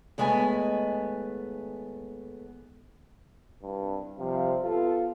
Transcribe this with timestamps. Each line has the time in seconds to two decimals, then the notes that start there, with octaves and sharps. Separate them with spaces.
0.18 D#2 G#3 A3 B3 G#5
3.62 C2 G2
4.18 C3 F3 G3 F5
4.63 B3 F4 A4